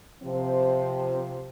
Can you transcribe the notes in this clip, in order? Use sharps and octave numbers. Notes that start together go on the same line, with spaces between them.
C3 F3 C4